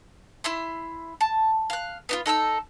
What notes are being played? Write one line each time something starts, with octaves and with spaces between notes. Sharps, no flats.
E4 E5 C6
A5
F5 F#6
B3 D#4 F4
D#4 A4 G5 E6